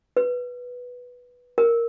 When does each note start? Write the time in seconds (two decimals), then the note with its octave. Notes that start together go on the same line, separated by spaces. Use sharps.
0.17 B4
1.58 A#4